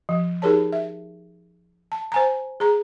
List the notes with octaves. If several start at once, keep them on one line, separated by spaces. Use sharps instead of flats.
F3
D#4 G4 G#4 A#4 C#5 A5
E5
A5
C5 G#5 A#5
G#4 A#5